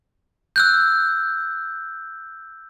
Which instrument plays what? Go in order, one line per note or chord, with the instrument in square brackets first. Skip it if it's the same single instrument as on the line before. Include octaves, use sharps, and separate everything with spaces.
[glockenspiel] E6 F#6 G6